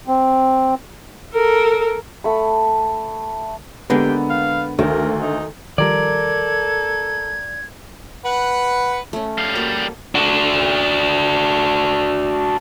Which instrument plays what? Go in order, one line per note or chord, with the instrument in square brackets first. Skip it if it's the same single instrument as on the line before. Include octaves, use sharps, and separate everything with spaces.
[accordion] C4
[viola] A4 A#4
[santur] A3 F#5 B5
[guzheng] D3 G#3 A#3 [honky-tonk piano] B3 [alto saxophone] G4
[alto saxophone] F5
[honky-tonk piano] D2 [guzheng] D#3 [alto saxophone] A#4
[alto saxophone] D#4
[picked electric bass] D#3 F3 G3 [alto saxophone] A4 [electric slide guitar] A#4 D5 [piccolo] G#6
[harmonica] B4 F#5
[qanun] A3 C#4
[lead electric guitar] G3 F5
[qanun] A#3 F#4 A4
[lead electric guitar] D4 F#4